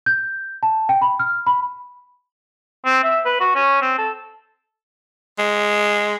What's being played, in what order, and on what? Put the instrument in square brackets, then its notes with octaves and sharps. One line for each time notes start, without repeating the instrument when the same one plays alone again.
[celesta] G6
A5
G5
B5
F6
B5
[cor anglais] C4
E5
B4
F#4
C#4
C4
A4
[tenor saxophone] G#3